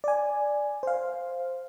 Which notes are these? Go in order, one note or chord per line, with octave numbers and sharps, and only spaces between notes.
D5 G#5
C5 F5